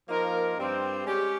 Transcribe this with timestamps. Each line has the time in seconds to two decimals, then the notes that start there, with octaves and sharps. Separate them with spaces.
0.09 F3 A#3 D#4 A#4
0.57 G2 G3 C4
1.04 G#3 C#4 G4 C#5